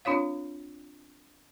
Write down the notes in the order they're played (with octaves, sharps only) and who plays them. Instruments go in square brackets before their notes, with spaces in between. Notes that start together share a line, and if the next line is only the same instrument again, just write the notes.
[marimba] C4 D4 F4 C#5 F5